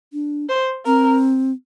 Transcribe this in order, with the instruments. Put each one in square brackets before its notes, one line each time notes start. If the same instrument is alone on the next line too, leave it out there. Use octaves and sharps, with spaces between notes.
[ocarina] D4
[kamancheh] C5
[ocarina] C4 [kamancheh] A#4